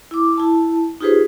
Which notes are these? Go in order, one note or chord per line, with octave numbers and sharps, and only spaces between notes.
E4 D6
E4 A5
D#4 F4 G4 G#4 B4 C5